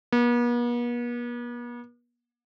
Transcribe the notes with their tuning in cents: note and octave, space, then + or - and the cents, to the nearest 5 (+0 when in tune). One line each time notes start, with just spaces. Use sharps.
B3 -45